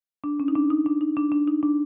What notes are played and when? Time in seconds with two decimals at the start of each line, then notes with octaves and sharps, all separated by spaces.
0.24 D4
0.40 C#4
0.48 D#4
0.55 D4
0.70 D#4
0.86 D4
1.01 D#4
1.17 D4
1.32 D4
1.47 D#4
1.63 D4